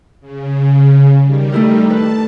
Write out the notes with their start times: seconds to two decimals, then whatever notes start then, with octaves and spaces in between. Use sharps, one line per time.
0.21 C#3
1.22 D#3 G3
1.52 A3 E4 A#4
1.90 B4 A5